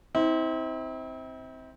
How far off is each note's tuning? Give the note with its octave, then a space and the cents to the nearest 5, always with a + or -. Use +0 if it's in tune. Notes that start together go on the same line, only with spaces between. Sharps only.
C4 +0 E4 -40